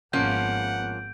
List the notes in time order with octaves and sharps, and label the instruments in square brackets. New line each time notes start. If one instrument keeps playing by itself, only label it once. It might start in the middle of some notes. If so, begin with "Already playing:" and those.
[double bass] G#1 B3 [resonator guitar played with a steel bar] F3 A#3 C#4 [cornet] F#5 [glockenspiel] G6 D7